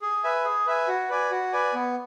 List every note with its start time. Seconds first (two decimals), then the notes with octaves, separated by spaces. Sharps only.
0.02 G#4
0.24 B4 E5 G#5
0.45 G#4
0.66 B4 E5 G#5
0.88 F#4
1.09 B4 D5 G#5
1.31 F#4
1.53 B4 D5 G#5
1.74 B3